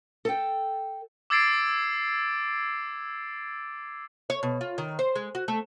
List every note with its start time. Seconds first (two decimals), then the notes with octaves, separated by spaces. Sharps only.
0.25 A4 G5
1.30 D6 E6 G#6 A6 C7 D7
4.30 C#5
4.43 B2
4.61 F4
4.78 D#3
4.99 C5
5.15 G#3
5.35 F#4
5.48 A3